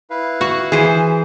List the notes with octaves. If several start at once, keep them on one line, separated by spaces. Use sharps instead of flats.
E4 B4 F5
F#4 F#5
E3 G#4 C5